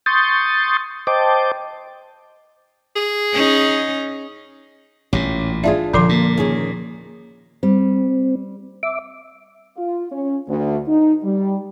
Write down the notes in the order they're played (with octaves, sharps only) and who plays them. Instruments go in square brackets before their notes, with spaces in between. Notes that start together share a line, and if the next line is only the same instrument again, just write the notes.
[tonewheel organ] C6 C#6 D#6 G6 A6
C5 D#5 G5 A5 D6
[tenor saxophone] G#4
[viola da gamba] C#4 D#4
[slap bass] A1 A#2 [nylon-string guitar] C#4 G4
[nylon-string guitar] D4 F4 G#4 [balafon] E5
[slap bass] D#1 [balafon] D3 F3 C6
[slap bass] A#2 [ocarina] A#3
[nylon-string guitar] D#3 C#4 G#4
[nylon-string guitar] G3 [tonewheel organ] C4
[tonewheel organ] E5 D6
[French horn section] F4
C#4
D2
D#4
G3